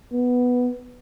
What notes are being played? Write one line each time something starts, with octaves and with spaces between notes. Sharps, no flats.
B3